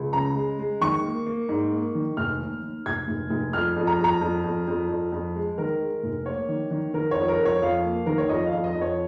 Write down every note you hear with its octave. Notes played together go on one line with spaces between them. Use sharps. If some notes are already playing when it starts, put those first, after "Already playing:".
Already playing: C#2
C#3 A#5
G#3
G#3
D#3 C#6
A#3
A#3
G#2
A#3
D#3
F1 F6
D#2
D#2
F1 G#6
F1
F1
F2 F6
F2
A#5
F2
A#5
F2
F2
F2
F2
F2
G#3
D#3 A#4
G#3
F1
A#3 C#5
D#3
D#3
D#3 A#4
F2 C#5
A#4
F2
C#5
F2 F5
A#3
D#3 A#4
C#5
F2 D#5
F5
F2
D#5
F2
C#5